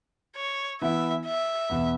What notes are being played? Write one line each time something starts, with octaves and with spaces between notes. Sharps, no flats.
C#5
E3 B3 E4 E5
E5
E2 B2 B3